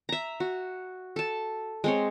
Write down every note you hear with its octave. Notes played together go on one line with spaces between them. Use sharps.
E5 A#5
F#4
A4 A5
G#3 C4 C#5